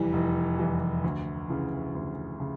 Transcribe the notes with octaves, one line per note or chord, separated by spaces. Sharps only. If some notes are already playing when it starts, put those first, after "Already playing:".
Already playing: F1 E2 E3 G3
F1
E2 E3 G3
D2
C#3 E3
D2
C#3